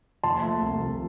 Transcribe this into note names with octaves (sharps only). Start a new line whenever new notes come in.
F3 A5 C6
A3
C2
F3